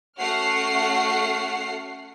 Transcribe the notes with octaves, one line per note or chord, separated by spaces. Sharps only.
A3 C#4 F#4 F#5 F6 C7